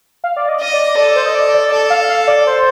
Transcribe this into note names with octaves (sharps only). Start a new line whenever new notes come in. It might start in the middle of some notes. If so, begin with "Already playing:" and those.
F5
D5
D#5
D#5
D5
A4 D5
C5
D#5
D5
D5
A4 D5
F5
F5
D5
C5